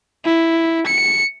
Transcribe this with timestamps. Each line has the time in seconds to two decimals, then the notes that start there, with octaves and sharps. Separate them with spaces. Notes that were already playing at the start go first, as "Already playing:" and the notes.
0.24 E4
0.86 C#7